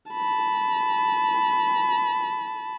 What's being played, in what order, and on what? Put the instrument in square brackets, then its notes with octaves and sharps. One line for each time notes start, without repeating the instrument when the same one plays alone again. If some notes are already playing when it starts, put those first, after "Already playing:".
[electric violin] A5 B5